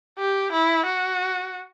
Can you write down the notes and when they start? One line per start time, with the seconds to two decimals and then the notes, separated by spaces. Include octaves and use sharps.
0.19 G4
0.52 E4
0.86 F#4